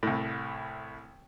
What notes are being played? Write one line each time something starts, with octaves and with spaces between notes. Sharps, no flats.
C2 A2